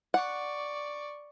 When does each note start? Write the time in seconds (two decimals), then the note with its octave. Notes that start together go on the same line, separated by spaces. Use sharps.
0.14 D5 F#5 C#6